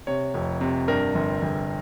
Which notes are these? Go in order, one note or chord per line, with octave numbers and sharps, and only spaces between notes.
C3 C#5
F1
C3
G2 A#4
G1
G1